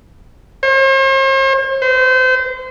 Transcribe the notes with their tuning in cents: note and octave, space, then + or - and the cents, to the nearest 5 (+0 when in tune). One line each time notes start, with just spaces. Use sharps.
C5 +45
C5 -30